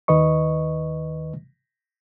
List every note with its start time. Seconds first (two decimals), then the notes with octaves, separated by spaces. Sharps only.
0.08 D#2 D#3 B4 D#5 C#6